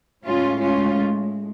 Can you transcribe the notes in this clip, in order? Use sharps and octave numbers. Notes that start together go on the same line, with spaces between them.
A2 G#3 C#4 F4
C#4 F4